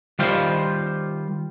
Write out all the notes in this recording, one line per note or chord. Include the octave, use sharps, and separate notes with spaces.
D#3 G3 F4 C5